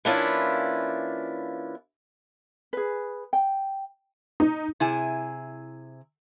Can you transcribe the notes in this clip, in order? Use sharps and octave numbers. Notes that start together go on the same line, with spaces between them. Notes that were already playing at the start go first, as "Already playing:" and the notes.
E3 A#3 C#4 D4 E4 F4
G#4 B4
G5
D#4
C3 E4 G#4 G#5